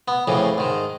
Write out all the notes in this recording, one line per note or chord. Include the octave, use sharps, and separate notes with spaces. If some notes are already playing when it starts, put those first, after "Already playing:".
B3
F2 A2 C#3 E3
G#2 D#3